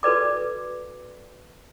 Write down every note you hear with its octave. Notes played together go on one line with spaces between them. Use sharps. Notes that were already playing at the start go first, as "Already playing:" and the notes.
F#4 A4 B4 D5 D6